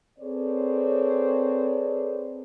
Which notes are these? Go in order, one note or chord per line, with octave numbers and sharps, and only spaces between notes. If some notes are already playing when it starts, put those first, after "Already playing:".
C4 G#4 A4 B4 C#5 D5